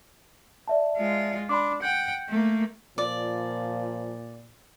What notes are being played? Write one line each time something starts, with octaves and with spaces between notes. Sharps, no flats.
D5 E5 A5
G#3 F4
D4 B5 C6 D6
F#5 G5 G6
A3 A#3
A#2 F3 D5